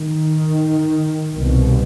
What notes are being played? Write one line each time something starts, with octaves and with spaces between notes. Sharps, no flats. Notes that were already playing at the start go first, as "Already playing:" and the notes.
Already playing: D#3
C2 B2